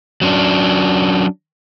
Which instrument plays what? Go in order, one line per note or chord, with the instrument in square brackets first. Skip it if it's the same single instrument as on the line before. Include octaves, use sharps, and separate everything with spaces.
[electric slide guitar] F#3 C#4 D4